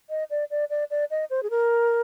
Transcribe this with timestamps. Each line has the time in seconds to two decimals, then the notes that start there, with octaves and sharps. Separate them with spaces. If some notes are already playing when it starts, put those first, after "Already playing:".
0.10 D#5
0.30 D5
0.50 D5
0.70 D5
0.90 D5
1.11 D#5
1.30 C5
1.43 G#4
1.50 A#4